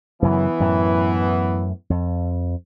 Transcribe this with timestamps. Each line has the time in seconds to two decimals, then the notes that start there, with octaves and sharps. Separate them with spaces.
0.22 F#2 C#3 E3 F#3 B3
0.60 F#2 A2
1.90 F2